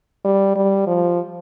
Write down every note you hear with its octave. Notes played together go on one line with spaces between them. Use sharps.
G3
G3
F3